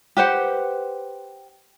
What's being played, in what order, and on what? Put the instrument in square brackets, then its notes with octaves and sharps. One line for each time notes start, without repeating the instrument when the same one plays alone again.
[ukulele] G4 B4 C5 F#5